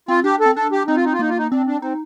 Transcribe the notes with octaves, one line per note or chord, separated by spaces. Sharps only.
C4 F4
D4 G4
A4
C4
D4 A4
G4
C4 D#4
F4
D#4
F4
A#3 D#4
F4
D#4
C4 D4
D4
C4 D#4